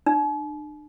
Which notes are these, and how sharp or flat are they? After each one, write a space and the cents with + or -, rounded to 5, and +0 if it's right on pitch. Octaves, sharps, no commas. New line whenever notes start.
D4 +40